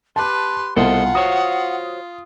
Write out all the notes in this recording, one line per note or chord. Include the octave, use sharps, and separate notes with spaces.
G4 B4 A5 C6 D6
C2 B2 F4 A4 C5 D#5 F#5
F#4 C5 C#5 D#6